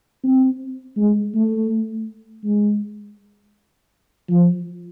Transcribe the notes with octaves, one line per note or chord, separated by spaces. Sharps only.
C4
G#3
A3
G#3
F3